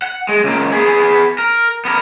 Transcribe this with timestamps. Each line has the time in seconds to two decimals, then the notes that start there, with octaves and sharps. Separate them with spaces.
0.02 F#5
0.29 G#3
0.44 C#2 A#3
0.72 B3 G#4
1.38 A#4
1.85 B3 A#4